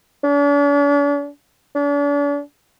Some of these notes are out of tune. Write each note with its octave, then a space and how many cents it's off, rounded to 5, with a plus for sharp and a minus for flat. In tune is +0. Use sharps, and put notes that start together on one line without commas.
D4 -45
D4 -40